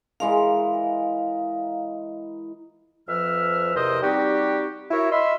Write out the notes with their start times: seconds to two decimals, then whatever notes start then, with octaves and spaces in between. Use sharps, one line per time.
0.20 E3 G#3 A#4 F5
3.08 F2 F3 B4 E5 F6
3.75 E2 C3 A#4 C5 D#5 D#6
4.02 G3 C4 D#4 F#4 G4
4.91 E4 F#4 A#4 C#5 E5
5.11 D#5 E5 B5 C6 E6 F6